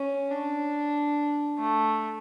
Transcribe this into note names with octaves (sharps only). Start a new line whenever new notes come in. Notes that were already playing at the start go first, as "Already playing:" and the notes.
Already playing: C#4
D4
A3